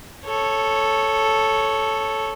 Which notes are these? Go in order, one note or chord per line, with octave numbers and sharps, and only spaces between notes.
A4 C#5